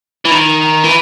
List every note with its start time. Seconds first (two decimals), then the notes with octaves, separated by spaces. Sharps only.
0.25 E3
0.31 D#3
0.84 E3